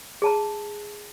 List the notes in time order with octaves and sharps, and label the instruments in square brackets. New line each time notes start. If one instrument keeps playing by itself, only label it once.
[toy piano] G#4 A5 A#5